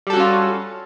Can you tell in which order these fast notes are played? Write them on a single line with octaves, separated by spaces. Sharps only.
G3 A4 F#4 C#4 F4